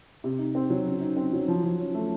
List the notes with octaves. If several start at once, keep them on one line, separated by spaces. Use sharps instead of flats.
C3
D#4
C4
F#3
C#3
D#4
C4
F#3
F3
F3
C#4
A3